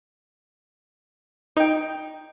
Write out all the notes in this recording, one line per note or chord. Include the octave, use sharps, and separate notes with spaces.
D#4 D#5 G5